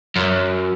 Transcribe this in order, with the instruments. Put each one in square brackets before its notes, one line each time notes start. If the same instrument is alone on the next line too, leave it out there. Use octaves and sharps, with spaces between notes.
[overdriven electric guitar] F#2